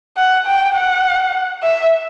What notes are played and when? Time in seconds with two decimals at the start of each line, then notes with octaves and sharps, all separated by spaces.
0.17 F#5
0.47 G5
0.75 F#5
1.63 E5